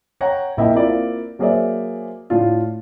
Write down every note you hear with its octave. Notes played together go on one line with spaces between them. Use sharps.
C#5 F#5 G5 A#5
A#1 A#3 E4 D#5 E5 G5
A#3 C4 E4 F4 D5 E5
F#3 A#3 G#4 C5 D5 E5
A2 D4 F4